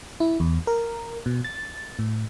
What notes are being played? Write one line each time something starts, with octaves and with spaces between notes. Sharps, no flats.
E4
E2
A#4
B2
A6
A2